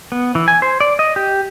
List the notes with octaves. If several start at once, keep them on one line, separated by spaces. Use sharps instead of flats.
B3
E3
G#5
C5
D5
D#5
G4